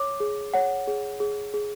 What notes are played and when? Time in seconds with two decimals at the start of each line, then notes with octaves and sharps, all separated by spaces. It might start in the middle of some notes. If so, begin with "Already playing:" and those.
Already playing: C#5 D6
0.20 G#4
0.54 C#5 F#5
0.88 G#4
1.20 G#4
1.54 G#4